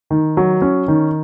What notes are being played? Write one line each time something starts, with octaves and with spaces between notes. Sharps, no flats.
D#3
F#3
C#4
D#3